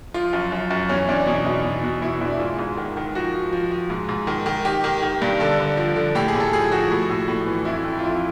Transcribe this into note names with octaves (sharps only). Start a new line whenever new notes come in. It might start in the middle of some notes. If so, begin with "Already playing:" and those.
F3 F4
F#2
F#2
F#2
E2 C#4
E2 D4
B2 D#4
E2
B2
B2
B2 E4
E2 D4
E4
G#2 F4
G#2
D#3
D#3
F3 F#4
F3
F3
F3
G#2
G#2
D#3
D#3
D#3 G4
D#3
D#3
G2
D3 A4
D3
F3
D3
A2 G4
G#4
A2
A4
F3 G#4
F3 F#4
A2
A2
A2
E3
F2 E4
F2
F4
F3 E4